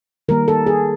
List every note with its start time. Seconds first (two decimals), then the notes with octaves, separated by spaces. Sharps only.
0.29 D#3 G3 A#3 A#4
0.48 A4
0.66 G#4